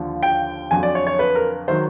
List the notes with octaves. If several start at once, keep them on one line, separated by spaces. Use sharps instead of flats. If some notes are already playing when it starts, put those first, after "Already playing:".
Already playing: D#2 D3 F3
G5
F2 D3 F#3 G#5
D5
C#5
C#5
B4
A#4
D#3 F#3 C5